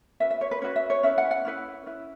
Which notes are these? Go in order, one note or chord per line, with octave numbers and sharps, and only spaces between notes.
C#4 F#4 B4 E5
E5
C#5
B4
C#4 F#4 B4 C#5
E5
C#5
C#4 E4 B4 E5
F#5
F#5
C#4 E4 B4
C#4 E4 B4